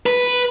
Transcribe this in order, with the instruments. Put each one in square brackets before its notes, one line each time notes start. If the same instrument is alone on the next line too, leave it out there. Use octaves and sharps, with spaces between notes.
[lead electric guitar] B4